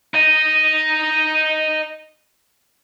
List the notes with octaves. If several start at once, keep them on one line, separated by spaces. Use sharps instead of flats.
D#4 D#5